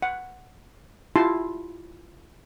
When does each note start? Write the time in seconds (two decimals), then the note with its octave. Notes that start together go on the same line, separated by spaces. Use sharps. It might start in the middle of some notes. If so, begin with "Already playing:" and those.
0.02 F#5
1.16 E4 F4 G4 A5 C6